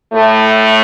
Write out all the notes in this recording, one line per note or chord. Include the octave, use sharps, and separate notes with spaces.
A2 A3